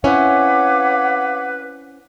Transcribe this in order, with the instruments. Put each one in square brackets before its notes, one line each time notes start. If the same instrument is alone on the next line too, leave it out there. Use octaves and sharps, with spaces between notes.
[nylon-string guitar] C4 C#4 E4 [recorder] B4 [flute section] C#5 F5 D6 [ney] F#5